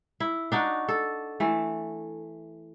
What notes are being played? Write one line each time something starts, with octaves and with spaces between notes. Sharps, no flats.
E4
D4 D#4 F#4
A4
E3 A3